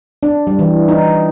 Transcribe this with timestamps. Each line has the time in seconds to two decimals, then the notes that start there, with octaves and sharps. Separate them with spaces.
0.23 D4
0.47 G3
0.59 E3
0.88 D#4